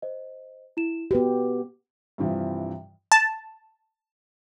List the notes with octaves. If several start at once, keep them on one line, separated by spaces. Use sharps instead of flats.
C5 D#5
E4 E7
B3 F#4 G4 B4
G2 C3 E3 F3
A5